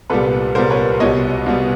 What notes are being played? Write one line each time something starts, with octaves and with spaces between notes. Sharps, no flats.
C2 A#2 G3 B3 A4 B4
C2 A#2 G3 B3 A#4 C5
B4 C#5
C2 B2 G3 B3 C#5 D#5
C2 B2 G3 B3